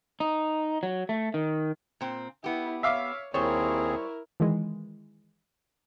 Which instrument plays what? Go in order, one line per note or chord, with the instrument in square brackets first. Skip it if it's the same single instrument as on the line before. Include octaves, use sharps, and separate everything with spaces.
[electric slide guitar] D#4
F#3
A3
D#3
[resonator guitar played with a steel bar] A#2 C4
[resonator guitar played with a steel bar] B3 G4 [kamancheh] E4
[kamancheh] C#5 [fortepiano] E5 F5 D6
[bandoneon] D#2 C4 G#4 [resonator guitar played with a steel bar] G3 C5 [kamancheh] E4 A#4 [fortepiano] C#5
[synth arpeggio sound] D#3 E3 G#3